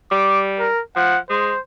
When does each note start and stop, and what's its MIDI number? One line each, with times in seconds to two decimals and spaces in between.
0.11 0.66 55
0.11 0.41 86
0.59 0.82 70
0.96 1.17 53
0.96 1.19 78
1.29 1.52 56
1.29 1.59 72